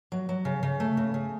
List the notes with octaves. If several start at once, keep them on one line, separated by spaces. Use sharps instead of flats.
F#3
F#3
C#3
C#3
A3
C#3
C#3